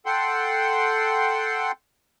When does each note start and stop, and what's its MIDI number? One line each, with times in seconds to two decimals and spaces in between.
0.06 1.71 69
0.06 1.71 78
0.06 1.71 79
0.06 1.71 84